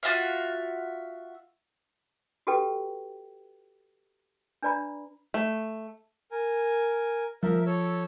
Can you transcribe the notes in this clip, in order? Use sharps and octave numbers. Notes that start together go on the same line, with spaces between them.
F4 F#4 E5 F5
F#4 G4 A4 B4 G5
D4 B4 D5 A#5 B5
A3
A#4 G#5
F3 A#4 E5
A4 C#5 E6